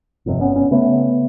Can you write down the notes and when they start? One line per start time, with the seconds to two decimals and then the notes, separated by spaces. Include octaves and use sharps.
0.26 G1 F2 C3
0.41 B3 C#4
0.56 B3 C#4
0.71 C#3 A3 B3